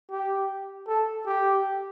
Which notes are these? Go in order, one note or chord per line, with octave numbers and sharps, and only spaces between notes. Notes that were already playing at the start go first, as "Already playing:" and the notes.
G4
A4
G4